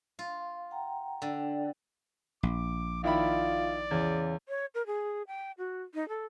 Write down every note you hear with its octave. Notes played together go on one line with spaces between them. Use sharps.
F4 F5
F#5 G5 A#5
D3 D5 G5
A#1 D6
D#3 E4 F4 D5 B5
E2 C#3
C#5
A#4
G#4
G5
F#4
D#4
A4